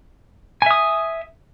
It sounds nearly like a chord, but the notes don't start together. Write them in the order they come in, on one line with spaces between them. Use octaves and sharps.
G#5 E5 D#6